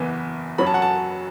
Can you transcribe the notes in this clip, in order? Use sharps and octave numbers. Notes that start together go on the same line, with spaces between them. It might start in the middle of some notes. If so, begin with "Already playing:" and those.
Already playing: F#1 E2 E3 B3
F#2 F#3 C#4 B5
A5
F#5
A5